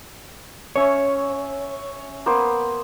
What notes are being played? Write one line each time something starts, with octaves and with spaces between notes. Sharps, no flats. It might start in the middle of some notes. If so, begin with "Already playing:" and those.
C#4 C#5 E5
A#3 B3 C5